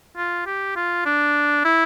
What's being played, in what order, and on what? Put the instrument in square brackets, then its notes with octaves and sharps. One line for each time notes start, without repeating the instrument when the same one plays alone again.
[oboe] F4
G4
F4
D4
E4